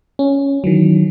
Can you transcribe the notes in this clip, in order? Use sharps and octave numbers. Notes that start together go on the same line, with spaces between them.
C#4
D#3 E3 F#3